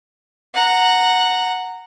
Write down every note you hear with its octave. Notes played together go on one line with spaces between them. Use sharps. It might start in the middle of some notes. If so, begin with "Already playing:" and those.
F#5 A#5